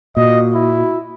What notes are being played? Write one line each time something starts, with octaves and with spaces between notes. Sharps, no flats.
A#2 F#4 D#5
E4